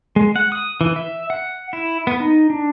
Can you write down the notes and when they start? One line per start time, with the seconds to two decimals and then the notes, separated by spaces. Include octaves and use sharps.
0.16 G#3
0.36 F#5
0.52 D#6
0.81 E3
0.96 E5
1.30 F#5
1.73 E4
2.07 B3
2.20 D#4
2.50 D4